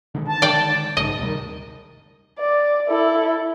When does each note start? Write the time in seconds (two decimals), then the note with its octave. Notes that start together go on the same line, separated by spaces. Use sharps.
0.15 D3 D#3 G#3
0.28 A5
0.42 D5 G5
0.97 A#1 G#2 C#3 D#5
1.19 D2 C3 D#3 G3
2.39 D5
2.89 E4 A4